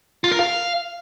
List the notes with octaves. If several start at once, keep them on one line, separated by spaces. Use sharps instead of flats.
F4
A#4
F5